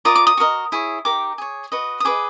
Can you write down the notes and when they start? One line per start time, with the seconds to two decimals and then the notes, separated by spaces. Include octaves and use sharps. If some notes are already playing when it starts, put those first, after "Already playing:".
0.05 F4 A#4 D5 D#6
0.15 D6
0.27 D#6
0.37 F#4 A#4 D#5
0.72 E4 G#4 C#5
1.05 D#4 G4 A#4 D6
1.38 G#4 C#5
1.72 F#4 B4 D#5
2.00 D#6
2.05 G#4 B4 D#5 D6